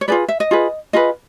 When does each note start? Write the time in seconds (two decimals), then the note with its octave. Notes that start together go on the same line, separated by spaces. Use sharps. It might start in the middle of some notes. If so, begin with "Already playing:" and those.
0.01 C#5
0.08 F4 G#4 B4 D5
0.28 E5
0.40 D#5
0.51 F4 G#4 B4
0.93 F4 G#4 B4 D#5